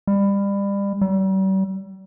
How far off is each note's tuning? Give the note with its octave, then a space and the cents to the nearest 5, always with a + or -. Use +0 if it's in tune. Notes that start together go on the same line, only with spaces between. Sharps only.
G3 +30
G3 -40